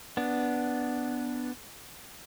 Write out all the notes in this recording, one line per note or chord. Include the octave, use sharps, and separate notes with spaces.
B3 D4